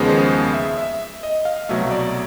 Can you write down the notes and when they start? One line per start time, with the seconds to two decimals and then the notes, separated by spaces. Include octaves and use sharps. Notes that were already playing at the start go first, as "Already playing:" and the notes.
Already playing: D#2 C#3 F3 G#3 B3
0.09 C5
0.54 E5
0.78 E5
1.23 D#5
1.45 F5
1.69 C2 B2 F#3 A3 E5
1.91 D5